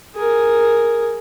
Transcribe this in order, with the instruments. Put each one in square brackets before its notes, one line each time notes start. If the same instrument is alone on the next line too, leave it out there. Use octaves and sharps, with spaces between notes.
[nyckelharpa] G#4 A#4